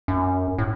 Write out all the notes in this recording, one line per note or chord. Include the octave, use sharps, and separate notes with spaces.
F#2
A2